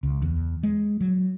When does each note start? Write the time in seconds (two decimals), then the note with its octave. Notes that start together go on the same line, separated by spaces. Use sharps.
0.03 C#2
0.22 E2
0.63 G#3
1.01 F#3